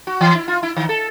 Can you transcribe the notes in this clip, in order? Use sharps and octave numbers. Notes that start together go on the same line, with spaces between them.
F#4
E3
E4
F4
E4
D#3
A4